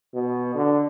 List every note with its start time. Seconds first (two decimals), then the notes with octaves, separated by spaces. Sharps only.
0.14 B2
0.55 D3